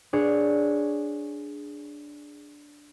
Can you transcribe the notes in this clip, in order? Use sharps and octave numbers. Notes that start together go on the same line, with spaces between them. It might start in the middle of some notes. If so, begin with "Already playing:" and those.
D4 G#4 C#5